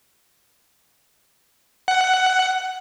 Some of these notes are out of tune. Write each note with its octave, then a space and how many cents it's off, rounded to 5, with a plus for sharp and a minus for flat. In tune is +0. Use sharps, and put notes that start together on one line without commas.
F#5 +10